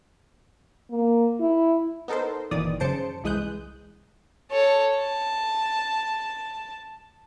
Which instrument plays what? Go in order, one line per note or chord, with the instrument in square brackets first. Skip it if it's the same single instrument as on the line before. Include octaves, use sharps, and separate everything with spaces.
[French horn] A#3
E4
[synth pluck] B3 D#4 A4 A#4 C5
G1 A#2 D#3 E3 D5 D#6
F#2 C#3 C5 A5 C#7 D7
C2 E3 G#3 D#6 F#6 G6
[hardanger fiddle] A4 C#5
A5